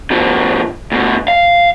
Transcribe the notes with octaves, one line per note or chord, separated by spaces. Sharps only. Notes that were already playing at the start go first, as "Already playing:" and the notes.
B2 F3
D2 B2
F5